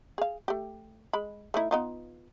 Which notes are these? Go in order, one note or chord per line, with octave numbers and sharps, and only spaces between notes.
G#4 F5
A3 G4
G#3 B5
A3 D#4 E4
B3 D#4 F4